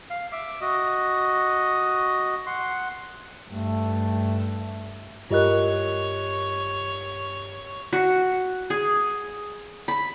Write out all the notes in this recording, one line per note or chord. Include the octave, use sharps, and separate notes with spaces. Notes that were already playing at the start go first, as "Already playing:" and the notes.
F5
E5 D6
F#4 D#5
F#5 C6
G2 A3
G2 E4 F4 G4 A#4 C#5 D#5 F#6
F#4
G#4
B5